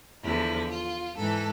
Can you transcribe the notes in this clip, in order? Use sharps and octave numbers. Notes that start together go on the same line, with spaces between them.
E2 D3 F3 E4
F4
G#2 E3 A4